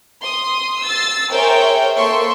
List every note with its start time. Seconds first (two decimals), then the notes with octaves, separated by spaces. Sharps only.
0.22 C6 D#6
0.84 E6 A6 C7
1.33 G#4 A#4 C5 C#5 E5 G5
1.97 A#3 A4 E5 C6 C#6